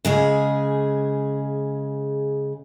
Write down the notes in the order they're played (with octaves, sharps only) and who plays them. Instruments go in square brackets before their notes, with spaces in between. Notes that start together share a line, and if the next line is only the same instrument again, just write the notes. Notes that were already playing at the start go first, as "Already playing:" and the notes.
[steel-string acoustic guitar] C#3 G#3 G#4